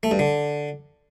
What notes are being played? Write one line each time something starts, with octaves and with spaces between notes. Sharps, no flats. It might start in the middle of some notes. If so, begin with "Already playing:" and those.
A3
G2
D3